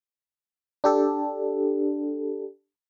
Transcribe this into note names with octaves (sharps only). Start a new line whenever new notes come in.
D4 G4 A4